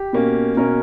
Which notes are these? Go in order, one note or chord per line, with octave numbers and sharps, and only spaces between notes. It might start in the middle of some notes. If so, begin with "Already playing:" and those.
Already playing: G4
B2 A#3 C#4
B2 A#3 C#4 A#4